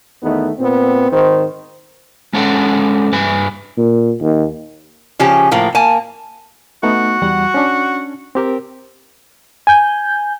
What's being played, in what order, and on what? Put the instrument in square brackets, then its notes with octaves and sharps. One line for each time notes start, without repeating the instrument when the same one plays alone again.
[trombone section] E2 D#3 A3 B3 D#4
A#2 B3 C4
G#1 D#3 C5
[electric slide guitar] G#3 C#4 A4 C5 F#5 G5
G2 B4 G#5
[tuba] A#2
D#2
[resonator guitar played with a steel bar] C#3 F3 C#4 G4
A2 F3 A#3
A#3 G#5 A5
[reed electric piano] A3 B3 D#4 [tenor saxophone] F#4
[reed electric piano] E2 G3 F#5
C#4 D4
C4 G4 A#4
[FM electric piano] G#5 G6